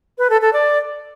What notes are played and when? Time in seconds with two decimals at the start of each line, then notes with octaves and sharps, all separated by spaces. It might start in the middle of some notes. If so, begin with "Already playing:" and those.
0.18 B4
0.30 A4
0.42 A4
0.53 D5